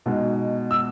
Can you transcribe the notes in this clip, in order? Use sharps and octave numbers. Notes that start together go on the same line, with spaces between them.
B2 G#3 D#4
E6